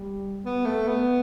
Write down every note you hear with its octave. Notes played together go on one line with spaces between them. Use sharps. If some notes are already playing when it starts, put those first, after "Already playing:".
Already playing: G3
B3
A3
B3